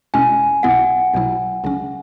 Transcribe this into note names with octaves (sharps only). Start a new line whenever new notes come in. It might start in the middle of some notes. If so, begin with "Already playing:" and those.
E2 B2 G#3 C#4 E4 G#5
B1 B2 B3 E4 F#5
B1 B2 F#3 E4
C#2 C#3 F#3 C#4